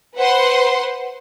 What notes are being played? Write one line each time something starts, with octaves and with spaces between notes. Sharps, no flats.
B4 C5 F#5 C6